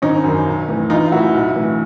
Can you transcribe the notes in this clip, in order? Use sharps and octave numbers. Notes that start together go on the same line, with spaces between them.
G#1 C#4 D#4
F#2 D#3
B1
A2 E3
A1 D#4 F4
A2 E3 E4 F#4
B1
A2 E3